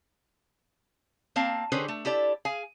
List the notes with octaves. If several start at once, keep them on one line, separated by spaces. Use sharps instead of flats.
A#3 C4 F5 A5
D3 C#4 G4 G#4 B4 C5
A3
E4 G4 A4 D5
G#4 F5 G#5